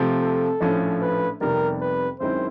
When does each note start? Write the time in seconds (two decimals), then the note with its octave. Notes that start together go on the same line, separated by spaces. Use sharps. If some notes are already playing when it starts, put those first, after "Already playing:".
Already playing: C3 F3 A3 C4
0.22 A4
0.61 A#1 A2 F3 A3 C#4
1.01 B4
1.41 F2 C3 D#3 G3 B3 A#4
1.81 B4
2.20 F#2 D#3 G#3 C4 E4 C5